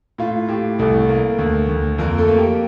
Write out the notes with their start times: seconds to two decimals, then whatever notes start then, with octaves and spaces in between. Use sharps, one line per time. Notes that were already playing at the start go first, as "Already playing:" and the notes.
0.18 A2 F4
0.49 A2 G4
0.78 C2 A3 A4
1.09 A#3
1.39 D2
1.69 D2
1.98 F2 A#3 A#4
2.18 A3 A4
2.28 A#3
2.38 G4